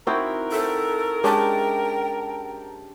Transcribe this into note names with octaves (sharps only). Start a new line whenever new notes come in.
C4 D#4 E4 F#4 A#4 G5
A4 C5 E5
G#3 C#4 D4 G4 G5 A5